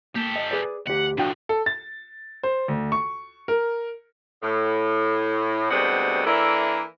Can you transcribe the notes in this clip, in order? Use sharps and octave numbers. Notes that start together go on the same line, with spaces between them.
A#3 G4 A4
D#5
G#4 B4 D5
D2 G4 F#5
A2 F3 D4 F#4 G5
A4
A6
C5
D2
C#6
A#4
A2
D2 B2 G3 G#3 C4 F#5
E3 A#3 D4 A4 A#4 E5